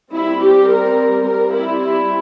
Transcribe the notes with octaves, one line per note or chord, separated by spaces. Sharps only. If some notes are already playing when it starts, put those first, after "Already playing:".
G3 C4 E4
G4
A#4
G3 C4 A#4
E4
E4